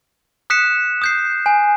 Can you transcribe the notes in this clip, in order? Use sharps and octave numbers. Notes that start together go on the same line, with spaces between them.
D#6 F#6 B6 C#7 E7
D#6 G6 C7
G#5